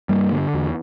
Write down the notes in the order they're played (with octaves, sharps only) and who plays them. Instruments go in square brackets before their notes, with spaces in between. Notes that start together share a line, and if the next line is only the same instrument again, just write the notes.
[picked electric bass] G2 G3 A#3
D3
E2